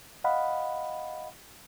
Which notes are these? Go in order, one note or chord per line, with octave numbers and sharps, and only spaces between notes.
D#5 F5 F#5 B5